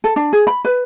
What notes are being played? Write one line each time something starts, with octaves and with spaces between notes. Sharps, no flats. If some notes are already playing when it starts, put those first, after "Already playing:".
A4
D4
G#4
B5
B4